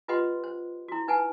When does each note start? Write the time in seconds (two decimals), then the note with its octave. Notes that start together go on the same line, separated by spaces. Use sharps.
0.08 F4 G4 B4 D#5 F#5 C6
0.44 C5
0.88 E4 F#4
1.08 D#4 B4 F#5 G#5 A5